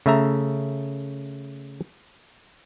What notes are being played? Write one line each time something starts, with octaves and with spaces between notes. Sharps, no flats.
C#3 A3 E5 A#5